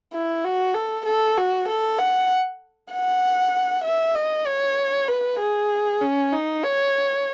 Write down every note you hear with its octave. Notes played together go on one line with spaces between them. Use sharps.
E4
F#4
A4
A4
F#4
A4
F#5
F#5
E5
D#5
C#5
B4
G#4
C#4
D#4
C#5